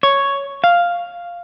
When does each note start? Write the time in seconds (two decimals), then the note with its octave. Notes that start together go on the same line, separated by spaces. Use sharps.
0.03 C#5
0.64 F5